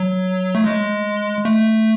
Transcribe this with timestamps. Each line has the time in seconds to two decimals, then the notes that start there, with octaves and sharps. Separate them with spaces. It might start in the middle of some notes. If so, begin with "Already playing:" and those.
Already playing: F#3
0.55 A3
0.64 G#3
1.45 A3